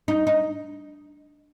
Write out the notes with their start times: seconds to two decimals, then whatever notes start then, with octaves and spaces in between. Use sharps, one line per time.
0.08 D#4
0.27 D#4